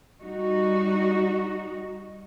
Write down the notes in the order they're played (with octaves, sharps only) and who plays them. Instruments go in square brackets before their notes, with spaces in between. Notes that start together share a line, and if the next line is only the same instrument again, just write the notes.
[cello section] G3 D#4 F#4